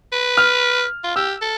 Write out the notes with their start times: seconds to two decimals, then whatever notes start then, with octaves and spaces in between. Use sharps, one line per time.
0.12 B4
0.38 F6
1.04 F4
1.16 G4 E6
1.41 A4